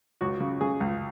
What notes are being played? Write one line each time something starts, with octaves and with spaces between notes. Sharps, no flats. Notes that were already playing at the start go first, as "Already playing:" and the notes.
C#2 F#4
C#3
C#3 G#4
C#2